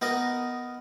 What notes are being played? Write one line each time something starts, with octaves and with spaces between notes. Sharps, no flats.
B3 D#4 A#4 D#5